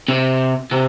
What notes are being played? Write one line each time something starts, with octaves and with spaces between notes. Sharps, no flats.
C3
C3